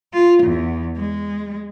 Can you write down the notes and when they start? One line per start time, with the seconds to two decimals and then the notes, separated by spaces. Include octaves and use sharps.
0.13 F4
0.43 E2
0.96 G#3